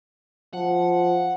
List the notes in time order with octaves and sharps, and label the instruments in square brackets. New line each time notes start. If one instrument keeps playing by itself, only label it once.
[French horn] F3 [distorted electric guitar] F#5